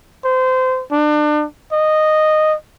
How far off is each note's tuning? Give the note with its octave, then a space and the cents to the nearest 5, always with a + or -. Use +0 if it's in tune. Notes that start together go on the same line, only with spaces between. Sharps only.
C5 -25
D4 +35
D#5 -10